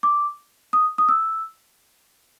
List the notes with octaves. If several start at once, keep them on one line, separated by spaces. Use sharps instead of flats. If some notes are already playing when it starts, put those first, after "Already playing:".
D6
D#6
D#6
E6